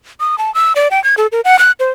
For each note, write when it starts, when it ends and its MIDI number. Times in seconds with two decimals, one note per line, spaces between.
0.20 0.38 87
0.38 0.53 81
0.55 0.73 88
0.76 0.88 74
0.91 1.02 79
1.04 1.15 92
1.17 1.27 69
1.32 1.41 70
1.45 1.59 78
1.59 1.72 90
1.80 1.91 72